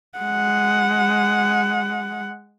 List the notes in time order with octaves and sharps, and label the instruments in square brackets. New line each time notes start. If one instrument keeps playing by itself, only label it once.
[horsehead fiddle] G#3 F#5